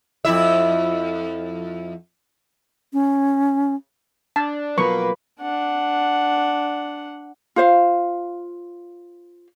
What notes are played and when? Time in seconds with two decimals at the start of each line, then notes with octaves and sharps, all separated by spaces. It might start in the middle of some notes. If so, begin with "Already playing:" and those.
0.25 F2 E4 E5
2.93 C#4
4.36 D4 A5
4.78 B2 F3 F#3 A#3 B4 C#6
5.40 D4 F#5
7.56 F4 C5 F5